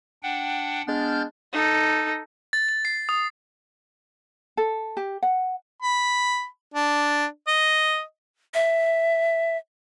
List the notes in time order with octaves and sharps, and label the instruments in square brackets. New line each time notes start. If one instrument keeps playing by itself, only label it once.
[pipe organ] D4 F#5 G5
[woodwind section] G#3 B3 D4 [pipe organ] F6 G6 A6
[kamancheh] D#4 A4
[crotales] A6
A6
C7
D#6
[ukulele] A4
G4
F#5
[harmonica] B5
D4
D#5
[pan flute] E5